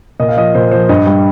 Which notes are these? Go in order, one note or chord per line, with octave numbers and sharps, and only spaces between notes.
A#2 D#5
F5
F3 D#5
A#2 C5
F3 C5
G2 D#5
G3